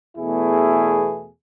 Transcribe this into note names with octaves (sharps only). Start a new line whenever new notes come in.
E2 B2 A3 E4 G#4